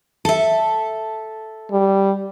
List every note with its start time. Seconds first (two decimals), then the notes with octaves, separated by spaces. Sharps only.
0.25 A4 E5
1.72 G3